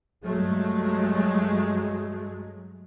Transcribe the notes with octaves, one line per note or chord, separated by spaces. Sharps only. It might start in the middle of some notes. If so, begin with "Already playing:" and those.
G2 F#3 G#3 A3